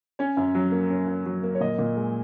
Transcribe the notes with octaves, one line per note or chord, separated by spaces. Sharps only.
C#4 C#5
F#2
F#3
A#3
C#4
F#2
F#3
A#3
C#5
A#2 D#5
A#2
G#3